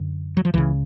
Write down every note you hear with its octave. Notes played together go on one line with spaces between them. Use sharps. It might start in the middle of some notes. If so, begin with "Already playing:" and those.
Already playing: F#2 D3
F#3
F3
C#2 C#3 E3